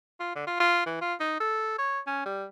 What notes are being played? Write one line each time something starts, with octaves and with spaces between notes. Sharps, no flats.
F4
D3
F4
F4
E3
F4
D#4
A4
C#5
C#4
G3